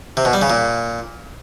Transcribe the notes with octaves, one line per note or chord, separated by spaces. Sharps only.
C3
B2
G3
C#3
A#2